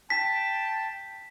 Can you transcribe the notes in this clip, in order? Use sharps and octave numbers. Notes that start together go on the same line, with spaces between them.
G5 A5 B6